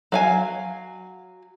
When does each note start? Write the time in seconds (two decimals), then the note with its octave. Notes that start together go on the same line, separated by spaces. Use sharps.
0.12 F#3 F5 G#5